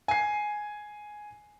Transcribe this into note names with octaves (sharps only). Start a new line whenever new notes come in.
G#5 C7